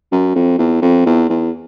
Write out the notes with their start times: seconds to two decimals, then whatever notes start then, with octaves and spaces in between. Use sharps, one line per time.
0.12 F#2
0.35 F2
0.58 E2
0.82 F2
1.06 E2
1.29 E2